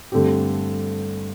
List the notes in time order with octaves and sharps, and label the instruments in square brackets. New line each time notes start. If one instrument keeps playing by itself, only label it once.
[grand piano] G2 D3 A3 C4 G4